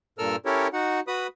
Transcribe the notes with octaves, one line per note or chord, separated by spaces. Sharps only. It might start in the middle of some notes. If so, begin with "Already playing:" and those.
G2 A#2 A4 A#4 E6 F6
C#4 E4 G4 A4 A#4 C#5
D#4 F#4 F#5
F#4 B4 B5 D#6